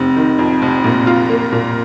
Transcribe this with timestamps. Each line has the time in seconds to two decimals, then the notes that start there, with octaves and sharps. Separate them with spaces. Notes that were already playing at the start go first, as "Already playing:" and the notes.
Already playing: F1 C4 D#4
0.16 D#3
0.39 F2
0.62 F1
0.84 A#2
1.07 F4
1.30 A#3
1.52 A#2